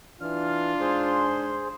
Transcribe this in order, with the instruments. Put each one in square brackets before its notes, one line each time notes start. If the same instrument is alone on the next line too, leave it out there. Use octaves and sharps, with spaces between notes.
[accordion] E3 F6 [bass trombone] D4 [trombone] F4
[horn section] G#2 G#5 C6 [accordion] G#4 C5